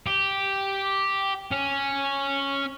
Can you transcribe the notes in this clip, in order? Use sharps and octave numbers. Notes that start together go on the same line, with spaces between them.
G4
C#4